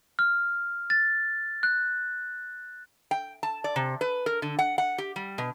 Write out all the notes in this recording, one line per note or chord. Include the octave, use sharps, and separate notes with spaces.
F6
A6
F#6
G5
A5
D5
C3
B4
A#4
D3
F#5
F#5
G4
G3
B2